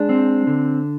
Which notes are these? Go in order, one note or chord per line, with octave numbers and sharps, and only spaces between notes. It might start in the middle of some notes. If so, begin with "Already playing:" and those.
Already playing: G#3 D4
C4
D3